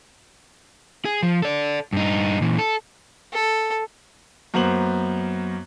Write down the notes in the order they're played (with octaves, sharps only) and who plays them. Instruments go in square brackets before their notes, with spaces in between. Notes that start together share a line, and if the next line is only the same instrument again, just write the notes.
[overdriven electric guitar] G#4
F3
A4 D5
G2 D#4
A#2 E3
A4
[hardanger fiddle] A4
[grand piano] F#2 A#3 B3 C5 F#7